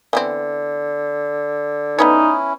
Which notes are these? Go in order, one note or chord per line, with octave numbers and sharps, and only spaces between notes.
D3 E3 B3 C4
B3 C#4 D#4 E4 B4 C#5